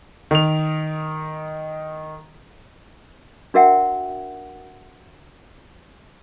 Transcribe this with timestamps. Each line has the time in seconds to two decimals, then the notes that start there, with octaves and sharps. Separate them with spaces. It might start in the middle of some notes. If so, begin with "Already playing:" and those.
0.31 D#3 F7
3.54 D4 F#4 A#4 E5 F#5 G5